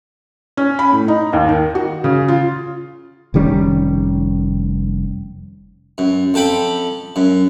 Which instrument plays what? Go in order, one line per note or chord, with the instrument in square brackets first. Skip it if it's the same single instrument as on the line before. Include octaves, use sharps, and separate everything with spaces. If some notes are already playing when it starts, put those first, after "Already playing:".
[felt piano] C#4
B5
A2
D#4
D#2
D#3
F#4
C#3
F4
[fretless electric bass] F1 D#3 G3 C#4
[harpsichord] F#2
F2 A4 G5 B5
F#2